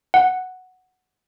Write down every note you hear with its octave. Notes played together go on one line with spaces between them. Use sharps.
F#5